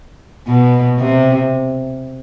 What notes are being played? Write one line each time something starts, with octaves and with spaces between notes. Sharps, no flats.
B2
C3